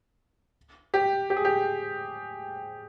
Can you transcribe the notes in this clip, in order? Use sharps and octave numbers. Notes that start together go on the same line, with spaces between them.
G4
G4
G#4
G4